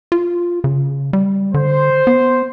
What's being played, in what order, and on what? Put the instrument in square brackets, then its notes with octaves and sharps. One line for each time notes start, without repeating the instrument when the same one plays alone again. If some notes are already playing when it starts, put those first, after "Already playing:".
[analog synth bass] F4
C#3
G3
[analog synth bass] D3 [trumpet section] C5
[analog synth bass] B3